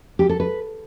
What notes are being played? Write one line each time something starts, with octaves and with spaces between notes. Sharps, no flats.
G4
A4
B4